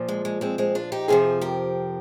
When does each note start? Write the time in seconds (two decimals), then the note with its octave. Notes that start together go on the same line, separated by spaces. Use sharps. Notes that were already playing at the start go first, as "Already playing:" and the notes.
Already playing: A#2 F3
0.09 G#3
0.25 G#3
0.41 G#3 C4
0.58 G#3 C4
0.75 D4 F4
0.92 D#4 G4
1.08 F2 C3 F3 F4 G#4
1.41 G4 A#4